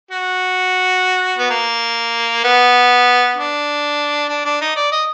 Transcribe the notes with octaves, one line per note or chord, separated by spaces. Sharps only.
F#4
B3
A#3
B3
D4
D4
D4
D#4
D5
D#5